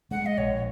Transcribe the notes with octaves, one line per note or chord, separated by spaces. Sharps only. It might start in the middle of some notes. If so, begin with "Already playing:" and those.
G#3 F#5
D#5
A#1 C#5